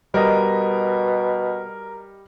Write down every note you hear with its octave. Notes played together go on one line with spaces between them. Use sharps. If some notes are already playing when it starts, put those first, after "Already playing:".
B2 G3 A#4 D#5